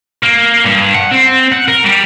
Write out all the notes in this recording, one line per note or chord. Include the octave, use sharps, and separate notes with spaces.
A#3
G2
F#5
C4
F#5
A#4
G3